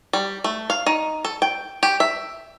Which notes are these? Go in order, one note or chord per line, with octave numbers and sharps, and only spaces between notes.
G3
A3
F5
D#4
A4
G5
G4
E5